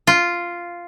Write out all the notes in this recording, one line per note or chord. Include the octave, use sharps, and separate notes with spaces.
F4